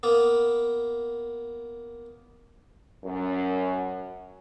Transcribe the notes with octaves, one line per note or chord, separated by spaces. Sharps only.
A#3 B3
F#2